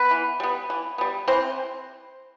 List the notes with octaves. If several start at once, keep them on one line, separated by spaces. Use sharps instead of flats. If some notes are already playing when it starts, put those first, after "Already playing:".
Already playing: B3 B4
E3
G3 B3
E3
G3 B3
E3 C4 C5